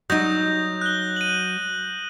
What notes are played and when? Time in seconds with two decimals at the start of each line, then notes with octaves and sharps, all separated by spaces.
0.10 F#3 D#4 D#6 G6 A#6
0.81 F#6 G7
1.16 D#7 F#7